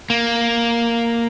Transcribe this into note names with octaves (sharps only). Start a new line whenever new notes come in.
A#3